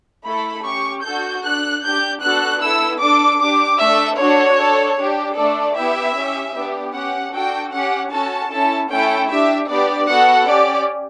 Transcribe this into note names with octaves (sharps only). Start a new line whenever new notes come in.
A3 E4 A4 B5
C#4 G4 C#6
D4 F#4 A4 G6
D4 A4 F#6
D4 G4 G6
B3 D4 F#4 A4 F#6
B3 E4 A4 E6
D4 A4 D6
D4 G4 D6
A3 D4 A4 E5
D4 F#4 A4 C#5
D4 A4
D4 G4
A3 D4 A4 D5
B3 E4 G4 E5
C#4 G4
B3 D4 G4
C#4 G4 F#5
D4 F#4 A4 G5
C#4 G4 F#5
C#4 F#4 A4 A5
C#4 E4 A4 A5
A3 C#4 E4 A4 G5
D4 G4 E5
B3 D4 G4 D5
B3 F#4 A4 F#5
C#4 G4 D5